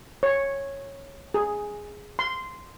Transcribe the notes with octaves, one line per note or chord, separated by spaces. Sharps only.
C#5
G#4
C6